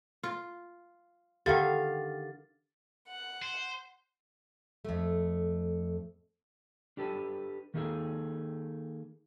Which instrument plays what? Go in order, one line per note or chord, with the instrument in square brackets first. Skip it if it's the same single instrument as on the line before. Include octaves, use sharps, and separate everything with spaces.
[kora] F4
[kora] D3 D#3 [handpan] G4 F5 [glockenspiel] A6
[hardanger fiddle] F#5
[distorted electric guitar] C5
[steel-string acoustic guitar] F2 A3
[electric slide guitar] D4 G4 A4 B4 A5
D#3 A3 A#3 D#4 G#4 A4